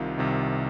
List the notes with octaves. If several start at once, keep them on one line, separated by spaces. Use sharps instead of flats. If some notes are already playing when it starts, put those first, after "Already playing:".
Already playing: C2 C3 D#3 F4
C2 C3 D#3